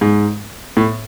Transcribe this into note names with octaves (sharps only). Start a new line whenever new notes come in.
G#2
A2